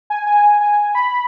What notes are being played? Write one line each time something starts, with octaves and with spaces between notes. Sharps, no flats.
G#5
G#5
G#5
B5